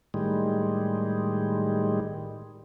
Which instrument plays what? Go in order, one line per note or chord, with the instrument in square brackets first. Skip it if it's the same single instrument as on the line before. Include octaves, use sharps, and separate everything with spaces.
[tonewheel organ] A2 D#3 G3 G#3